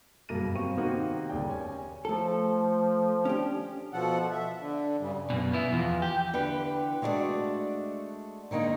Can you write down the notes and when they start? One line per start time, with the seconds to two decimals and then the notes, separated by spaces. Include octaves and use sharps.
0.29 F#1 G2 B2 A#3 A#6 D#7
0.55 F#3 G3 C4 F5 C#6 D#7
0.77 C3 D#3 A#3 C4 D#4 F#4
1.29 D#1 D2 G4 G#4 D5 G5
1.48 C#4 G#5
2.05 F3 A3 A4
3.25 C#4 D4 G4
3.93 B2 F3 A4 F#5
4.32 E5
4.60 D3
5.00 G2 C#3 G3
5.30 F#2 B2
5.53 B3 E4
5.73 E2 F3
6.02 G4
6.33 D3 E3 G4 B4
7.02 G#3 A3 D4 E4 F#4 D5
8.51 D3 D#3 G#3 A#3 D#4